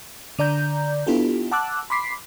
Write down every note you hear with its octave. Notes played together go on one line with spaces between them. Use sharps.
D3 D5 A#5 G6
B3 D4 E4 F4 G4 A4
F#5 A5 D6 E6 F#6
B5 C6 D6 B6 C7